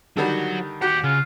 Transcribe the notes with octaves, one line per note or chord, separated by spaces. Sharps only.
D3 D#3 F#3 G3 F#4
D#2 F#4 G4 F#5
C#3 F4